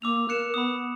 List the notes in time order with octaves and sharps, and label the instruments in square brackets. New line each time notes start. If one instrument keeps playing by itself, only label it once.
[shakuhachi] A#3 [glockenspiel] D6 E6 F7
[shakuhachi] A#4 [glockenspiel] F#6 C#7 E7
[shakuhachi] B3 [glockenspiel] B5 D#6